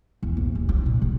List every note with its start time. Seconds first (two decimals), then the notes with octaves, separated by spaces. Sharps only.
0.23 E2
0.37 A#1
0.55 D#2
0.69 F4
0.86 A#2
1.02 C#3